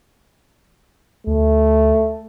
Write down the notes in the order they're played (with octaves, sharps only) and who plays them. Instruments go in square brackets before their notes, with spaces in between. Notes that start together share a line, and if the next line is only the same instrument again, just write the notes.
[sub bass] D2 [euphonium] A3